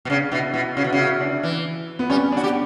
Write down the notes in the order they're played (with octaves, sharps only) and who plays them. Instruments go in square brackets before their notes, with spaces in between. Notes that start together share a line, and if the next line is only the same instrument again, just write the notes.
[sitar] B2
[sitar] C#3 [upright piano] D4
[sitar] B2 [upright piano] E4
[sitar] B2 [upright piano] E4
[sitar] C#3 [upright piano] F#4
[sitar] B2
[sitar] C#3 [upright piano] F#4
[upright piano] E4
D4
[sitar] E3
[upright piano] B3
[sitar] G3 [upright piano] C#4
[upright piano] D4
[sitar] F#4
G4